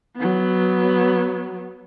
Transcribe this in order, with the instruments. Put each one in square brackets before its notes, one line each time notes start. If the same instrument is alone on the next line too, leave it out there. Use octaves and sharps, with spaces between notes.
[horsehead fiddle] F#3 B3